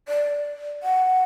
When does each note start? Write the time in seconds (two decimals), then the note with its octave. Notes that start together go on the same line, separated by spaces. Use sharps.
0.08 D5
0.83 F#5